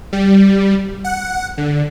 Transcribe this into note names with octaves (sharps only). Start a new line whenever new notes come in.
G3
F#5
D3